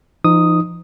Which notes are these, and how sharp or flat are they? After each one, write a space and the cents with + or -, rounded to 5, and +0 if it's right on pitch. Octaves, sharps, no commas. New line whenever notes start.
F3 -40 D#4 -10 D#6 +0